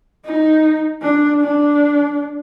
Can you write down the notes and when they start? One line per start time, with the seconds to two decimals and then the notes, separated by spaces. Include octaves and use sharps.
0.25 D#4
1.02 D4
1.41 D4